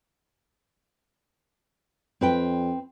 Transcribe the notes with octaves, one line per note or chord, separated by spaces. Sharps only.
F2 C4 B4 G5